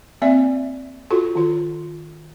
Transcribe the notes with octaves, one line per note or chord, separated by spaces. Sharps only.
A#3 C4 D5 E5
F4 F#4 A4
D#3 F4